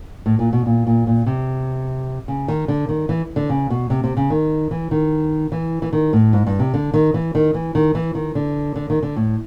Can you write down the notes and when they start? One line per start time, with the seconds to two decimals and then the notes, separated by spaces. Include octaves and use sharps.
0.26 A2
0.39 A#2
0.53 B2
0.66 A#2
0.87 A#2
1.07 A#2
1.26 C3
2.28 C#3
2.48 D#3
2.68 D3
2.89 D#3
3.09 E3
3.36 D3
3.50 C#3
3.70 B2
3.90 C3
4.04 C3
4.17 C#3
4.30 D#3
4.71 E3
4.91 D#3
5.52 E3
5.82 E3
5.93 D#3
6.13 A2
6.33 G#2
6.47 G2
6.59 C3
6.74 D3
6.94 D#3
7.14 E3
7.35 D#3
7.54 E3
7.75 D#3
7.95 E3
8.15 D#3
8.35 D3
8.76 D3
8.90 D#3
9.03 D3
9.16 A2